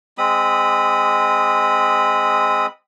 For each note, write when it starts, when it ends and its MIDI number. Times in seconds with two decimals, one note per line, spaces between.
0.18 2.67 56
0.18 2.67 60
0.18 2.67 83
0.18 2.67 87